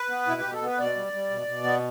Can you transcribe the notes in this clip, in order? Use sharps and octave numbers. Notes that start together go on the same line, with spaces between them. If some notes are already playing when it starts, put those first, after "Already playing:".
Already playing: B4
B3
B2 E4
B2 G4
A4
B3 B4
B2 D5
G3
G3
B2
B2
B3